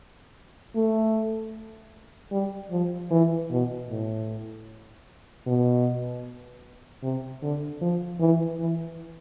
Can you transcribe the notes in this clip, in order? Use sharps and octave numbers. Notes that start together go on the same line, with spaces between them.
A3
G3
F3
E3
B2
A2
B2
C3
D3
F3
E3
E3